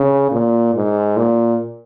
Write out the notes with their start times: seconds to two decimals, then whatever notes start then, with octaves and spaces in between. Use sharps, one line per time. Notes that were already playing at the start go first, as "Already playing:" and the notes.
Already playing: C#3
0.31 A#2
0.75 G#2
1.17 A#2